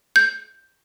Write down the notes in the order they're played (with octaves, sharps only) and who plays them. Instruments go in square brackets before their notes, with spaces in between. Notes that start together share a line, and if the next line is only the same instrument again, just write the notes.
[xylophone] G6